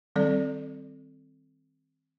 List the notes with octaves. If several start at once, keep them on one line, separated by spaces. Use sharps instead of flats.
D#3 G3 C4 A4 D5